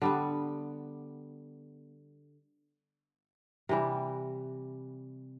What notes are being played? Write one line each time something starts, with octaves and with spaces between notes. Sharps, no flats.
D3 G3 B3
C3 E3 G3